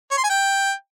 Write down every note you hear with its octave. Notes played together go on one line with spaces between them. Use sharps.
C#5
C6
G#5
G5